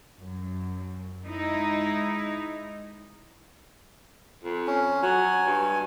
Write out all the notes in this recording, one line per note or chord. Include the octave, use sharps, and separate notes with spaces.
F#2
G#3 D#4 E4
F2
C#4
F#3 G#5
G2